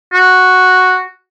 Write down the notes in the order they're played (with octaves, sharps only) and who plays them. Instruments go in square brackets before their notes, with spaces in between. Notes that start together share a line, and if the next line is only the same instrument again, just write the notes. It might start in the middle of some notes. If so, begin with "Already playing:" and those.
[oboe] F#4